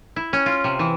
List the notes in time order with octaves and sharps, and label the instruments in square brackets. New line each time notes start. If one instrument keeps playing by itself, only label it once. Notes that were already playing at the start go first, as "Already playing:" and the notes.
[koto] E4
C#4
F4
C3
E3